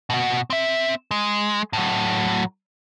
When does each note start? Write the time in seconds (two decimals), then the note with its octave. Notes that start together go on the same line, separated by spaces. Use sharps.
0.10 B2 F#4
0.50 C4 E5
1.11 G#3
1.73 A2 F#3